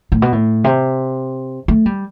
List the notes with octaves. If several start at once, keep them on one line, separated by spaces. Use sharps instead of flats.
A2
B2
A2
C3
A3
G3